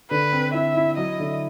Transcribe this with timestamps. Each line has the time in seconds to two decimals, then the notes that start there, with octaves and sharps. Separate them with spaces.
0.11 D3 B4
0.33 C4
0.54 E4 E5
0.76 E4
0.97 F#3 D#5
1.20 D3